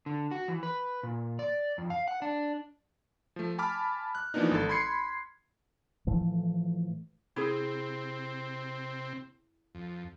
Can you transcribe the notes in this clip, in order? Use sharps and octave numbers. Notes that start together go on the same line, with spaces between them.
D3
F#4
E3
B4
A#2
D5
F2
F5
F#5
D4
F3 A3
G#5 A5 B5 D6 F6
F#6
E3 F3 A#3 B3 D4 D#4
G#1 A4
B5 C6 G#6 C7 C#7
A2 E3 F3 A3
C3 C4 E4 G#4
F2